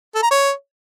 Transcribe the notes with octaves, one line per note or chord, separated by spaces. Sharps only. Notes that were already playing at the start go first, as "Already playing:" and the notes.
A4
A#5
C#5